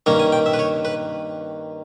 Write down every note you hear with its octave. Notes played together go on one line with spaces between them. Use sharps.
G2 D#3 A#3 C#4 C#5
G#5
G5
E5
B4
C#5
B4